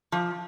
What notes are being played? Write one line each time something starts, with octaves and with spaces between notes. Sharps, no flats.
F3